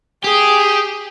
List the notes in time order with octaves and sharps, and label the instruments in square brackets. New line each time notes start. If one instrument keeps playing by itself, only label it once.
[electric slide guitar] G4 [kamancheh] G#4